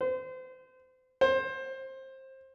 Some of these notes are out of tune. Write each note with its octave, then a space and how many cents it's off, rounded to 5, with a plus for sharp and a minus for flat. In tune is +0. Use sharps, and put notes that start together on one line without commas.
C5 -35
C5 +20